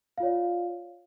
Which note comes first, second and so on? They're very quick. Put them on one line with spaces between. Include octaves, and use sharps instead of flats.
F5 F4 C#5 D5